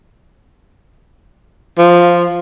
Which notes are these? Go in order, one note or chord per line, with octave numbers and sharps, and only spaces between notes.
F3